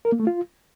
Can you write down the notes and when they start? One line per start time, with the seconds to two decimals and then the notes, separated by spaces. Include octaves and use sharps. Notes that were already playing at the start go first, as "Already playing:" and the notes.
0.05 A#4
0.12 A#3
0.20 A3
0.27 F4